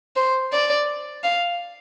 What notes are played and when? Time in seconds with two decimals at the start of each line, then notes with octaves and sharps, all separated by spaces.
0.16 C5
0.52 D5
1.24 F5